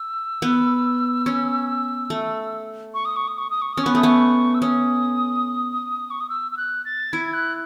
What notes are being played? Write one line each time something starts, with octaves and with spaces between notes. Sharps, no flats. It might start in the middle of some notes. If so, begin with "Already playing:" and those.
Already playing: E6
B3
C#4
A3
C#6
D#6
C#6
D#6
C#6
D#6
C#6
C#4 D#6
B3 C#6
A3 D#6
B3 C#6
E6
C#4 D#6
C#6
D#6
E6
E6
F#6
A6
E4 G#6
F#6